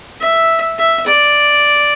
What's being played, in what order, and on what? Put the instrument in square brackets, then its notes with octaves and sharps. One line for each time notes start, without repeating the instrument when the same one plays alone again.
[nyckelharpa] E5
E5
D5